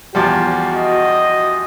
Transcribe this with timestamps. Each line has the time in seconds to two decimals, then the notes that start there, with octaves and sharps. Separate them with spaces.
0.15 E2 F3 G3 F#4
0.76 D#5